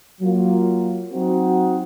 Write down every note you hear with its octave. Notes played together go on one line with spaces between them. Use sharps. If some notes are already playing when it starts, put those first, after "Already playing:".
F#3 A#3 F4
F#3 C4 D#4 F#4